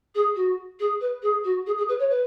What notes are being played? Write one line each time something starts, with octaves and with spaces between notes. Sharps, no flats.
G#4
F#4
G#4
B4
G#4
F#4
G#4
G#4
B4
C#5
B4